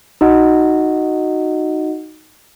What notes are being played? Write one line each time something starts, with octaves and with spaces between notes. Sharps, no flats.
D#4 F#4 D#5 F#5